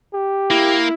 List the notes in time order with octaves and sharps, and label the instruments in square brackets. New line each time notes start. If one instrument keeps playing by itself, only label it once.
[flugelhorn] G4
[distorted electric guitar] A#3 [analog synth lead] E4